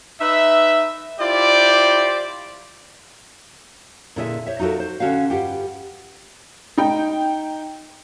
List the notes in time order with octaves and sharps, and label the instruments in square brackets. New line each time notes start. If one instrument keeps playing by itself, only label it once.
[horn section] D#4 B4 E5
E4 F4 G4 C5 D5
[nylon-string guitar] A#2 D3 E4 G#4 D5 E5
C5 C#5 E5
D#4 F4 F#4 A4 A#4
C5
D3 C#4 F#4 F5
G2 F4 G4 F#5 G5
[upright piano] D#4 G5